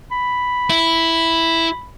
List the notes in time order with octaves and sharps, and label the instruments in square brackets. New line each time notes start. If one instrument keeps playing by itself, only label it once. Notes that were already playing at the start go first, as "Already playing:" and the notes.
[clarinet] B5
[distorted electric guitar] E4